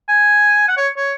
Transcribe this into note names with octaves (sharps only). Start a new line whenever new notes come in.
G#5
F#5
C#5
C#5